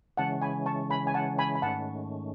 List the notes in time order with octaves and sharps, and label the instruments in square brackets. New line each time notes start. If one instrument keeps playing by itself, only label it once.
[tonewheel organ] C#3 E3 G#3 C#4 [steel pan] F#5 A5
[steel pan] G#5 B5
A5 C#6
G#5 B5
G#5
F#5 A5
G#5 B5
B5
[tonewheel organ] G#2 D#3 A3 C#4 [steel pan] F#5 A5